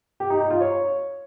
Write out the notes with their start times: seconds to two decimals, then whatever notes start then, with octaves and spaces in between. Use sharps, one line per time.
0.20 G4
0.30 D#4
0.40 D#4
0.50 F4
0.60 C#5